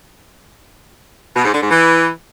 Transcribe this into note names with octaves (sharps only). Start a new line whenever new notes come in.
B2
G#2
D3
G#2
E3